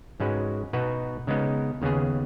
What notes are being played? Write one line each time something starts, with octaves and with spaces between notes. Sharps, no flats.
G#2 G#3 C#4 F#4 B4
B2 B3 D#4 F#4 B4
C#3 G#3 B3 D#4
D#2 C#3 B3 G#4